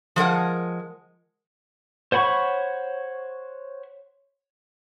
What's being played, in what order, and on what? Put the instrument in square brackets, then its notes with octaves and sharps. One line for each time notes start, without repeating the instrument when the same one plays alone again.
[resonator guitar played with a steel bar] F3 G#3 A#4 F#5
[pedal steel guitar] C5 C#5 F#5 B5 C#6